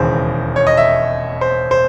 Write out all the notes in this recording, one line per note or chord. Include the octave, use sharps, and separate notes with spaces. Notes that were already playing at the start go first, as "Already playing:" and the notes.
Already playing: E1 D#2 C#3 E3 C5
C#5
D#5
E5
C5
C5